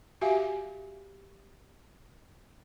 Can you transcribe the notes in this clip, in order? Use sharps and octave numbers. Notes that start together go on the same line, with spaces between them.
F#4 G4 E5 F5 G#5